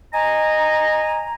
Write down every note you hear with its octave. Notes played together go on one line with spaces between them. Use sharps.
D#5 G#5 A#5